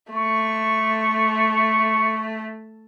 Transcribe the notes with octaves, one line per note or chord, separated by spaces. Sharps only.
A3 C#6